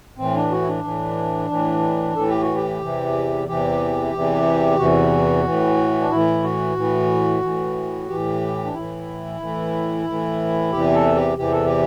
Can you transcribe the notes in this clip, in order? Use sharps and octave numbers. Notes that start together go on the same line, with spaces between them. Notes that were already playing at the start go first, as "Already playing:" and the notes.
A2 E3 C4
D4
F#4
E4
D4
A2 E3
A2 E3
A2 E3 A4
G4
F#4
G4
E2 C3 E3
E2 C3 E3 G4
E2 C3 E3
E2 C3 E3 F#4
A2 E3
D4
A2 E3 E4
F#4
A2 E3
A2 E3
A2 E3 G4
D4
A2 E3 E4
A2 E3
A2 E3
E2 C3 E3 G4
A4
G4
E2 C3 E3 G4
A4
G4